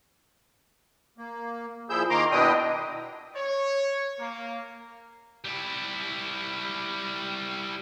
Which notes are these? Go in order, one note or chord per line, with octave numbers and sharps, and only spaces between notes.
A#3
A#2 F3 E4 G#4 E6 G6
D#3 A#3 A#5 C6 D6
B2 D4 E4 D#5 G5 D#6
C#5
A#3
G3 E4